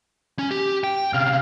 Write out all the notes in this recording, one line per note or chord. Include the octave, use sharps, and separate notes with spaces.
C#4
G4
G5
C3 C#4 F5